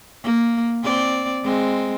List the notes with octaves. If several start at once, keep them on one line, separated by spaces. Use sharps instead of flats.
A#3
C4 D5
G#3 C4